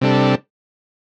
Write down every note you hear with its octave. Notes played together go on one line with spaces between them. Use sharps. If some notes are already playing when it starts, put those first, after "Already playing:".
C3 G3 D4 A4